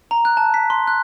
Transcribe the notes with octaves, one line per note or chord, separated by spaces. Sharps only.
A#5
F#6
A5
B6
C6
F#6